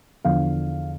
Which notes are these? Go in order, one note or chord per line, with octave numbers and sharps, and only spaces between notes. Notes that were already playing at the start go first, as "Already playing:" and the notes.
E2 D3 F3 F5